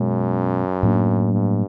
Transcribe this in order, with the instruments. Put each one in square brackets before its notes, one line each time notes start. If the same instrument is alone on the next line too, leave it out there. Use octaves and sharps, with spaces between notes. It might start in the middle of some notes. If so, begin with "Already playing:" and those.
Already playing: [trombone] F#2 [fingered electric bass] B2 G#3 C#4
[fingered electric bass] A2 F#3 A#3 D4
[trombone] G2